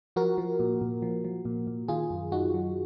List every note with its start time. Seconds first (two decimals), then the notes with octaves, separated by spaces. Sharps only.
0.16 F3 F#4 A#4
0.38 F3
0.60 A#2
0.81 A#2
1.02 F3
1.24 F3
1.45 A#2
1.67 A#2
1.88 D#3 F4 G#4
2.10 F#2
2.32 F#2 D#4 F#4
2.54 F#3